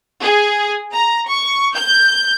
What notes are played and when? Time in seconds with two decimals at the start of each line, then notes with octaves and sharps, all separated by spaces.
0.21 G#4
0.93 A#5
1.27 C#6
1.75 G6